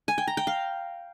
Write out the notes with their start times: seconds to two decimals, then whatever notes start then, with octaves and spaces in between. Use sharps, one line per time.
0.08 G#5
0.18 G5
0.28 A#5
0.37 G5
0.47 F5